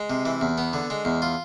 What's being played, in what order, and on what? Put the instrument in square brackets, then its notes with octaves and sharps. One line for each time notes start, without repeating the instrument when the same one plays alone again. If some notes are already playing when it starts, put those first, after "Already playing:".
Already playing: [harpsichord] G#3
C3
E3
E2
B3
D3
G#3
E2
F4